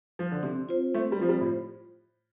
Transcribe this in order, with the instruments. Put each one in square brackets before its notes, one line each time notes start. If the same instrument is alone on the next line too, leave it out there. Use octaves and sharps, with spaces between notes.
[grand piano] F3
D3
[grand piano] C3 [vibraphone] C4
[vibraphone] F4 C5
[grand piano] A3 [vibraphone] C4
[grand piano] G3
[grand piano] F3 [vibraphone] F4
[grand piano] G3 [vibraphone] C5
[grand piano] A2